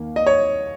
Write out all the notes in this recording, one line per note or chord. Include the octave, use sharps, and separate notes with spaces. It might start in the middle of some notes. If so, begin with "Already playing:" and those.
Already playing: D#2 A#3
D#5
C#5